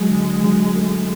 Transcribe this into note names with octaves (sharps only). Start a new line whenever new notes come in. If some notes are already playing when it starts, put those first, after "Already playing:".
Already playing: F#3 G#3
D3
F#3
A3